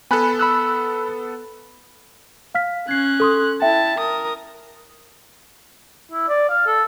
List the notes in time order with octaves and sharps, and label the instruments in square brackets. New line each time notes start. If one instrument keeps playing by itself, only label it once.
[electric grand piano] B3 A4 [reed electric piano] G#5 B5 F#6
[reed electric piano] B5 E6 F#6
[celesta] F5 F6 B6
[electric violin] C#4 F#6 [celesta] G#6 C7
[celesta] A4 C6 D#6
[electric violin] E4 A5 [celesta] E5 G5
[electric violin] A#4 D#6
[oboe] E4
D5
F5
A4